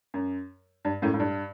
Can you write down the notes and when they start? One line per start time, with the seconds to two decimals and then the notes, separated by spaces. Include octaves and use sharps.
0.14 F#2
0.85 G2
1.02 F#2 A2
1.14 A2
1.20 G2